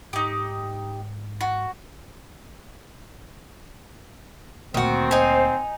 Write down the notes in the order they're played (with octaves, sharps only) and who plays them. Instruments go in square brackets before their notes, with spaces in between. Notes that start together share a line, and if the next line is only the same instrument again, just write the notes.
[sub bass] G#2 [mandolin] D#4 G4
[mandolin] F#4
[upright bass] D2 A#2 [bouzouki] D#3 F#4 [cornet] C4
[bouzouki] D#4 G#5 [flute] C5